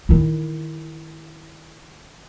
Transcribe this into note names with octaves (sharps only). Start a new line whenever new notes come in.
D#3 E4